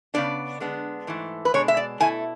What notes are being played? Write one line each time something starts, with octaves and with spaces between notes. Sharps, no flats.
C#3 E3 B3 D4 D5
D3 G#3 B3 D4
G#2 E3 A3
B4
B2 G#3 D4 C#5
E5
D5
B2 A3 E4 G#5